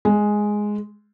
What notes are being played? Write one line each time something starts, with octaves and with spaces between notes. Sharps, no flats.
G#3